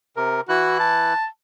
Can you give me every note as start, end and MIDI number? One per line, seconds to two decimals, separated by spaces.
0.16 0.41 48
0.16 0.41 70
0.49 1.14 52
0.49 1.14 64
0.49 0.77 66
0.49 1.14 90
0.80 1.26 81